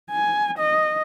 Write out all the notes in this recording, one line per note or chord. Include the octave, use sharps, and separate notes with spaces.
G#5
D#5